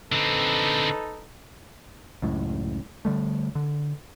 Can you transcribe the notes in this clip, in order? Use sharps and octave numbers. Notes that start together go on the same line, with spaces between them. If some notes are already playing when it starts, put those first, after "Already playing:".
D3 C4 D#4 A4 B4
C#2 F#2 A2
D3 G3 A3
D3